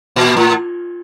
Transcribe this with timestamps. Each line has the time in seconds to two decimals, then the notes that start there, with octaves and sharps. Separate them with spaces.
0.16 A#2
0.37 A2